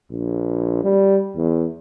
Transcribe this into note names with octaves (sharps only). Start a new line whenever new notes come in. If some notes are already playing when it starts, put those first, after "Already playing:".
A#1
G3
E2